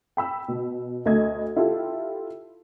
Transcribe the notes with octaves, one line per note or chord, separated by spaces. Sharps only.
G5 B5 E6
B2
D2 A3 D#5 G#6
E4 F4 G4 A4